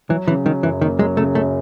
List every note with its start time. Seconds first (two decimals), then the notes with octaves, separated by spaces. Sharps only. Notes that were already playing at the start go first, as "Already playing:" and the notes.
0.09 E3 F#3
0.28 C#3 E3
0.45 D#3 F#3
0.63 F#2 E3
0.81 D#3 A#3
0.99 F#3 G#3
1.17 C#3 A3
1.35 F#2 A3